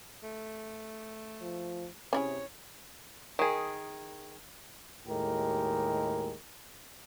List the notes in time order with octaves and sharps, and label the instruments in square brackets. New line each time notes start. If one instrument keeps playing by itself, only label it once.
[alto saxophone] A3
[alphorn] F3
[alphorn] C3 [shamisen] C#4 E4 G#4 [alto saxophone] C#5
[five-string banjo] D#3 G#4
[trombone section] D#2 A2 G#3 G4 A#4